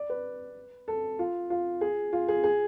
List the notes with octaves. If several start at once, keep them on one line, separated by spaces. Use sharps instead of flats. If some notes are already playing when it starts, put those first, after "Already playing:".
Already playing: D5
B4
A4
F4
F4
G#4
F4
G#4
G#4